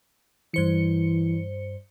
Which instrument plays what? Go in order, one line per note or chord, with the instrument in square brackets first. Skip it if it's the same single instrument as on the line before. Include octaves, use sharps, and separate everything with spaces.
[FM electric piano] G2 C5 C#7 [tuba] E3